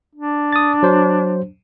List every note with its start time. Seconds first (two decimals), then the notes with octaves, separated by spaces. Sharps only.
0.15 D4
0.52 D#6 A6
0.83 F#3 C5